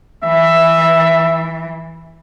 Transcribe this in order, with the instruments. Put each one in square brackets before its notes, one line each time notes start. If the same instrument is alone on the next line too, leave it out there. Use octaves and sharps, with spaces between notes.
[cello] E3 [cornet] E5